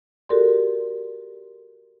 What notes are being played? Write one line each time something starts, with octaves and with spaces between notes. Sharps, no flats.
F#4 G4 A4 A#4 D5 C6